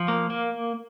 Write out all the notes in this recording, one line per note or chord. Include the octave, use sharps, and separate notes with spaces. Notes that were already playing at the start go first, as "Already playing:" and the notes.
Already playing: F3
A#3
A#3